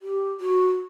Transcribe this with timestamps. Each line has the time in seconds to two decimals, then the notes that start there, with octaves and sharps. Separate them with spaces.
0.02 G4
0.40 F#4